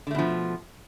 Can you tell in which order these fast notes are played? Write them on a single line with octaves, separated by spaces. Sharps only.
D3 A3 B2 F3